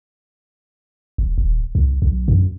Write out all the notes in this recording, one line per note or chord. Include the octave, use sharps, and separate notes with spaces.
E1
D#1
C2
B1
F#2